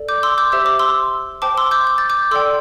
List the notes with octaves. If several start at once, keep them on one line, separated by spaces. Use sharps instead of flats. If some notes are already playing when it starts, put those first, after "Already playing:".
Already playing: A4 D5
D6 G6
C6 E6
D6 G6
G4 C5 E5 E6
D6
C6 E6
C5 G5 A5 D6
C6 E6
D6 G6
G6
A6
D6 G6
A4 D5 G5 C6 E6